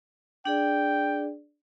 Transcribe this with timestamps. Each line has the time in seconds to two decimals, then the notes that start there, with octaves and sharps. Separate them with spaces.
0.45 D4 G#4 D5 G5